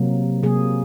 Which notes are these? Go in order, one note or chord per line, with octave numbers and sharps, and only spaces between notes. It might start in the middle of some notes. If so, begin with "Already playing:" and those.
Already playing: C3 F#3 A#3
C3 F#3 A#3 G#4